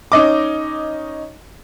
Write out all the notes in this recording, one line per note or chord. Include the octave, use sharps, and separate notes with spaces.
C#4 D#4 D#5 D6